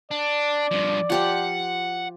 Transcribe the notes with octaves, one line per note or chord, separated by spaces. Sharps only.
D4 D5
G2 F3
F3 G4 F5 F#5